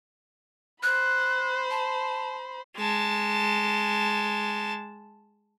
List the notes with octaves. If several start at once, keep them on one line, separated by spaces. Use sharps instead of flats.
C5 B5 F#6
A5
G#3 A5